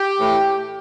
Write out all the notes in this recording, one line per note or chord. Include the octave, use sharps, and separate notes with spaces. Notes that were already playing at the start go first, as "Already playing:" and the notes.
Already playing: G4
A2 E3